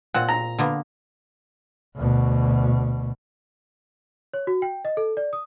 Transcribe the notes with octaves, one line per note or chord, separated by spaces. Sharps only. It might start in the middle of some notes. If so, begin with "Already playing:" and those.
A#2 C4 F#5
A#5
D3 A#3 B3
D2 B2
C#5
F#4
G5
D#5
A4
D5
D#6